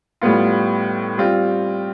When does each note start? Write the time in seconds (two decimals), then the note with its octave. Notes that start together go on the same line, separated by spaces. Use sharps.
0.21 A2 G3 B3 F4
1.18 G3 C4 F4